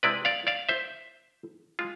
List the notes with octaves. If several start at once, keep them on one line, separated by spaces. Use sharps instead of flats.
C3 G#3 C4 E4 B4 D5
D5 F5
D5 F5
C5 E5
G#3 F4